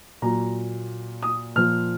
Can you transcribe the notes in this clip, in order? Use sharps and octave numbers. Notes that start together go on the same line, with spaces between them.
A#2 F#3 A#5
D#6
A#2 F3 F6